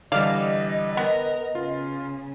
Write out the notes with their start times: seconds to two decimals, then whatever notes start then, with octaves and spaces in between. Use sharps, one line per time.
0.12 D3 E3 G3 D5 D#5 F5
0.97 B3 A#4
1.55 C#3 F4